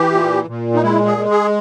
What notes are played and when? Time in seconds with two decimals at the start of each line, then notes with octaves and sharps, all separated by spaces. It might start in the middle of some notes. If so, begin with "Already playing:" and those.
Already playing: E3 G4
0.12 A#2
0.48 A#2
0.75 D#4
0.83 G#3 E4
1.06 G#4
1.18 G#3
1.30 G#4